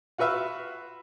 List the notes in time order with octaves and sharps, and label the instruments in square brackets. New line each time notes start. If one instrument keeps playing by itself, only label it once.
[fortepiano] F4 F#4 B4 E5 F5